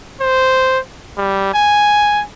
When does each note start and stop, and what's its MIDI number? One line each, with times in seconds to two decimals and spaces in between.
0.21 0.79 72
1.18 1.50 55
1.54 2.24 80